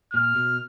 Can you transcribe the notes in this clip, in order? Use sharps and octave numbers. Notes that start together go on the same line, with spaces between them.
A#2 F6
B2